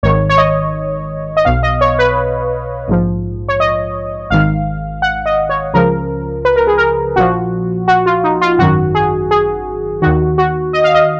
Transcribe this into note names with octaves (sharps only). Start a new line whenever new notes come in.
G#1 G#2 D#3 C#5
C#5
D#5
D#5
B1 B2 F5
D#5
C#5
B4
A#1 G#2 F3
C#5
D#5
G#1 G#2 D#3 F5
F#5
D#5
C#5
C#2 C#3 F3 A#4
B4
A#4
G#4
A#4
A#1 A#2 F3 F#4
F#4
F4
D#4
F4
G#1 F#2 D#3 F#4
G#4
G#4
D#2 D#3 F#4
F#4
D#5
F5
D#5